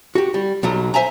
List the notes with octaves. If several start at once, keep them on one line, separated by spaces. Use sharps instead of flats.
F#4 G4
G3
B1 B2 F#3 D#4 A#5
C5 E5 G#5 A#5